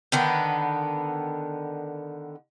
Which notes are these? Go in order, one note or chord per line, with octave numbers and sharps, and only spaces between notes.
D3 D#3 B3